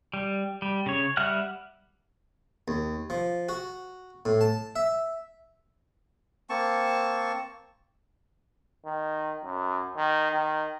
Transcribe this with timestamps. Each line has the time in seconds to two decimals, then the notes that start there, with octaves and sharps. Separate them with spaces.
0.14 G3
0.62 G3
0.86 C#3 C#5
1.17 G3 E5 F#5 F6 F#6
2.68 D#2
3.10 F3
3.49 F#4
4.25 A2
4.41 A5
4.76 E5
6.50 A#3 C4 A5 C#6
8.86 D#3
9.44 F#2
9.97 D#3
10.32 D#3